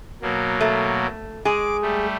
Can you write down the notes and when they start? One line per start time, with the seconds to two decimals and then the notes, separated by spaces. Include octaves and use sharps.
0.22 B2 F#3 A#3
0.61 A3
1.45 G#3 G#4 D6
1.82 G3 A3